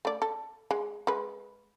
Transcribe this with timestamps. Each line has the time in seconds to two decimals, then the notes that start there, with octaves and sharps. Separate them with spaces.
0.05 A3 D5
0.22 A4
0.71 G#3
1.07 G#3 B4